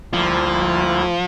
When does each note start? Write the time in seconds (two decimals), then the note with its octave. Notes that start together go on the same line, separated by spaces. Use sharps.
0.13 D2 D3 F3 G3 A#3 E4